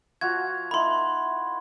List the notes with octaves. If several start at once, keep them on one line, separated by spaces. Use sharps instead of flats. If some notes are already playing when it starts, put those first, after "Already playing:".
F3 F#4 F5 G#6
A#3 D#4 E4 B5 C6